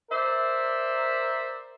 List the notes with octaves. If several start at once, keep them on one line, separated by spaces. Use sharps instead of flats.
A#4 C5 D5 E5